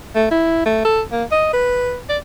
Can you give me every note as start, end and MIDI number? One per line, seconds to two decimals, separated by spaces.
0.15 0.27 57
0.31 0.64 64
0.65 0.83 57
0.85 1.01 69
1.12 1.24 58
1.31 1.48 75
1.53 1.97 71
2.09 2.17 74